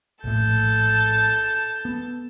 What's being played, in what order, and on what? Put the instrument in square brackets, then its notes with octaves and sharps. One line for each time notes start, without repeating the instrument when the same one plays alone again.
[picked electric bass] A#1 A2 [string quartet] A4 A5 G6
[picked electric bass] B3